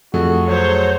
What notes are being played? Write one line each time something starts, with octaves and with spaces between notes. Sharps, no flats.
F2 A3 F#4 G#4 A4
F#3 C5 C#5